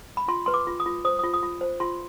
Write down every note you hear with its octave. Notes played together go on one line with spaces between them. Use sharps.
B5
F4 C6
B4 C6
D6
F4
D#6
F4
C5 D#6
D#6
F4
D#6
F4
C5
F4 C6